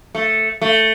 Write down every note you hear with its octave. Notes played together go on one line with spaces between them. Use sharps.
A3
A3